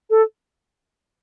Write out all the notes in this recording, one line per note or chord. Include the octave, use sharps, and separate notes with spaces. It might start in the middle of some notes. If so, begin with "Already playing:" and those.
A4